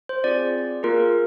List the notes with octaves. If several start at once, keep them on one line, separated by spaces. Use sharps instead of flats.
C5
C4 F4 G#4 D5
A#3 F4 G#4 A#4